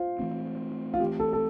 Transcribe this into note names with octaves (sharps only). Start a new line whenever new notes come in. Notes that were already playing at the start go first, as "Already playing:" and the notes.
Already playing: F4 C5
E3 A3 C4
F4
E3 A3 C4 G4
A4
A4